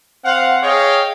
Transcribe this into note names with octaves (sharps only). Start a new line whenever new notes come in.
C4 F5 F#5
G#4 C#5 D#5 F5 G5